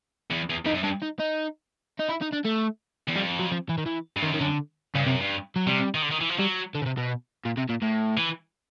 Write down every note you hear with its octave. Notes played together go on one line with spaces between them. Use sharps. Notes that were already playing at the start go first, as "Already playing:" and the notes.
E2
E2
F2 D#4
F#2
G2 D4
D#4
D#4
D#4
E4
D#4
D4
A3
E2
F2 G3
F#3
F3
E3
D#3
E3
G2
F#2 D#3
D#3
D3
G2 C#3
F#2 C3
G2
F#3
C3 G3
D#3
D3
D#3
E3
F3
F#3 G3
D3
C#3
C3
B2
A#2
C3
A#2
A2
E3